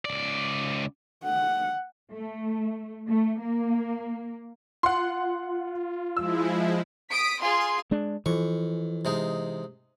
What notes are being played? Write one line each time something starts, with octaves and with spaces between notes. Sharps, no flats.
C#2 D5
F#5
A3
A3
A#3
F4 F#5 C6
F3 G#3 E4 E6
D#6 B6 D7
F4 G#4 C6
G#3 D4
F2 E3 C#6
C3 G#3 D#4